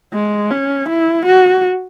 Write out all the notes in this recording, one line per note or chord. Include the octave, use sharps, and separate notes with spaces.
G#3
C#4
E4
F#4